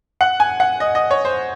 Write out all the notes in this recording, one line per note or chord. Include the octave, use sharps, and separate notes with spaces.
F#5
G#5
F#5
D#5
D#5
C#5
C5